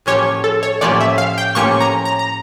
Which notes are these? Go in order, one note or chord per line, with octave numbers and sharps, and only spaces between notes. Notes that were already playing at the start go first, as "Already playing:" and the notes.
A2 F3 A#3 C#4 G4 C#5
A4
C#5
A2 F3 A#3 C#4 G4 D5
E5
F5
G5
A2 F3 A#3 C#4 G4 C#6
A#5
A#5
A#5